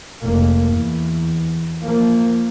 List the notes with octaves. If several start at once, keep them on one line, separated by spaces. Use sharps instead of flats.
F1 A#3
E2
F3 A#3